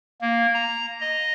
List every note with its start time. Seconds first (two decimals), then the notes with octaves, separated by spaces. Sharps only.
0.21 A#3
0.54 A#5
1.00 D#5